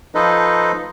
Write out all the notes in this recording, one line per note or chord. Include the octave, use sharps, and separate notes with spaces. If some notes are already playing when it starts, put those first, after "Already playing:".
F3 D#4 A4 B4 C5 D#5